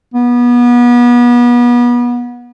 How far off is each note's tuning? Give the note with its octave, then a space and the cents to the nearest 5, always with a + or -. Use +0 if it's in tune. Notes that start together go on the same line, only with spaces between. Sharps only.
B3 -30